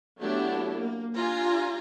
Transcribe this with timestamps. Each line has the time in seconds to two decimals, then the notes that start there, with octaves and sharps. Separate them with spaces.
0.19 F#3 A3 B3 D4 E4 G4
0.77 A#3
1.14 D4 F4 G4 G#5 A#5